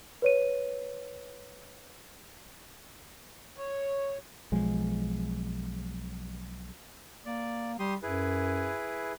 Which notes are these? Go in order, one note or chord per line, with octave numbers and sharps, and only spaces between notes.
B4 C#5 D#7
C#5
B1 F3 G#3
A#3 D5
G3 G4 C6 D#6
F#2 E4 G#4 B4